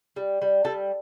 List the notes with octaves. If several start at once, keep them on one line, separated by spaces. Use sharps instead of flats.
G3
G3
G3 A4